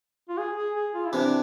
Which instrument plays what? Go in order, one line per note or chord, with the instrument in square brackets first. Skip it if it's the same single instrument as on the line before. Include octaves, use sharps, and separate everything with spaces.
[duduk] F4
G#4
G#4
G#4
F4
E4
[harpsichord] C3 E3 [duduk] D4